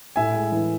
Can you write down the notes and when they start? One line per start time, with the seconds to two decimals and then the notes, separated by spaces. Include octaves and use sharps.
0.16 A2 E5 G#5
0.34 G#3
0.52 E3